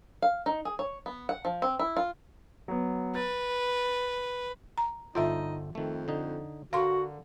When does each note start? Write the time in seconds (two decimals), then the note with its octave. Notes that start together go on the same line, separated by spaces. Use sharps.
0.22 F5
0.46 D#4
0.65 G#4
0.79 C#5
1.06 B3
1.29 F#5
1.45 F3
1.62 C4
1.79 E4
1.97 F4
2.68 F#3 B3
3.15 B4 A6
4.78 A#5
5.15 G1 D#4 F4 A4 C5 E5
5.75 F2 D#3 A3
6.08 D3 D#4
6.73 D3 F#4 A#4 F5 A#5 C6